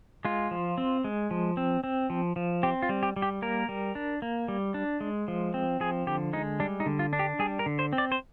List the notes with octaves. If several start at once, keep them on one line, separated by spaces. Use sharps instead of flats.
G#3 F4
F3
C4
G#3
F3
C4
C4
F3
F3
C4 G4
F4
G3
G4
G3
G4
A#3 A#4
G3
D4
A#3
G3
D4
G#3
F3
C4
F3 G#4
D3 G4
G#3 D#4
G3 D4
D#4
D3
F4
D4
G4
G3 G#4
A#4
D3
C5
C4
D5
C5